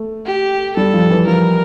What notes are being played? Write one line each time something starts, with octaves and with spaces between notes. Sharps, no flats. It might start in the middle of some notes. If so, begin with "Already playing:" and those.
Already playing: A3
G4
G3 A4
F3
E3
F3 A#4